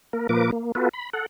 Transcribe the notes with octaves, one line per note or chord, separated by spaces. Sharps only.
A#3 A#4
A#2 F3 A#3 A#4 B4 D6
A#3
B3 F4 F#4 A4 B4
B5
A4 F#5